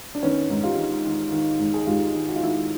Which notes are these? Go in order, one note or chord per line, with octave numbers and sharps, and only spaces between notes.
D4
D#3 B3 C#4
G#2
F4 G4
D#3
D#3
D#3
G#2
G#4
G#2 F4 G4
D#3
F#4
F4
D#3 E4 F#4